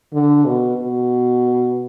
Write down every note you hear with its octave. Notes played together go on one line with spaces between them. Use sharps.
D3
B2
B2